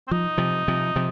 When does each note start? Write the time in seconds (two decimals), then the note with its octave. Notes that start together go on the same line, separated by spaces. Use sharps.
0.07 C4
0.11 F3 D#4
0.38 C3 F3
0.68 C3 F3
0.96 C3 F3